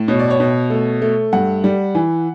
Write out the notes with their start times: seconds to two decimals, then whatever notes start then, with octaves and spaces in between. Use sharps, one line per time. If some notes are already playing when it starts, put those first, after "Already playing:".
Already playing: A2
0.08 B2 C#5
0.19 D5
0.30 C#5
0.40 B2
0.70 A3
1.02 A3
1.33 G2 F#5
1.64 G3
1.95 E3